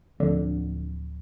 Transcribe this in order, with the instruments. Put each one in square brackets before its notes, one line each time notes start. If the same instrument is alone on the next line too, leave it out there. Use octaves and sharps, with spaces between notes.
[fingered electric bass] D1 F3 C4 [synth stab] D3